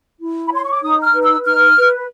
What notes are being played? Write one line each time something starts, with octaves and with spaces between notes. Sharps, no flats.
E4
B5
C#5 C6
C#6
D6
D#4 D#6
F6
B4
E6
D#4 F6
B4